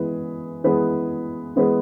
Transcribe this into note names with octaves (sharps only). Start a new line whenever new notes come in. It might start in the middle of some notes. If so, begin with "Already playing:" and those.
Already playing: E3 G#3 B3 G#4 B4
E3 G#3 B3 G#4 B4
E3 G#3 B3 G#4 B4